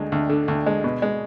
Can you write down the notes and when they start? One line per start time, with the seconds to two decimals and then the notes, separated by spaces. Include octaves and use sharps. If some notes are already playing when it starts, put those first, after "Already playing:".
Already playing: D2 G#3
0.12 D2
0.29 D3
0.48 D2
0.67 G#3
0.84 B2
1.02 G#3